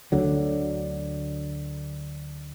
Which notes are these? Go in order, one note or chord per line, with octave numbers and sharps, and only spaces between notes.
D2 D3 F#3